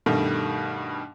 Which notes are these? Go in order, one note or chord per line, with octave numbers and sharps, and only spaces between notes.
G2 B2 D#3 G3 A3